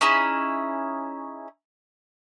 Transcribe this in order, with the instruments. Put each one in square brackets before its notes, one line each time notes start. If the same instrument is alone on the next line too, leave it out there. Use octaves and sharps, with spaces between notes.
[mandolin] C#4 D#4 E4 G#4